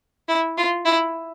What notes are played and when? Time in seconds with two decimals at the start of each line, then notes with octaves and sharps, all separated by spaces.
0.28 E4
0.57 F4
0.85 E4